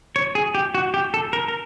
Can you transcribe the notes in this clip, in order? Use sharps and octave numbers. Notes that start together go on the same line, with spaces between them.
C#5
G#4
G4
F#4
G4
A4
A#4
A#4